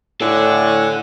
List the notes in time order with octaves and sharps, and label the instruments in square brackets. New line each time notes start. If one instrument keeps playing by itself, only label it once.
[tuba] A2 [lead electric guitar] A4 D5 [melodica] F#5 G#5 E6